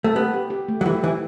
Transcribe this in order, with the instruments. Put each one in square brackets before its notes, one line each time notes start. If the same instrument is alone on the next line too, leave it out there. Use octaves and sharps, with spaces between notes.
[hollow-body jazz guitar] A3
[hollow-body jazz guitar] B3 [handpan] G4
[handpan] G4
G4
A3
[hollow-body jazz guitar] F#3
[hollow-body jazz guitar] E3 [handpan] G4
[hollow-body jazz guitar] E3 [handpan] G4